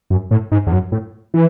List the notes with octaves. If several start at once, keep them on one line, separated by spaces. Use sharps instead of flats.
F#2
A2
G#2
E2
F#2
A2
E3